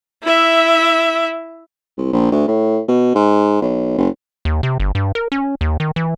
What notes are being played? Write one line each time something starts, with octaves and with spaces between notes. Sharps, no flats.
E4 E5
C2
A#1
D2
A2
B2
G#2
B1
F#1
D#2
C3
G1
G2
A#4
C#4
D#2
D#3
E3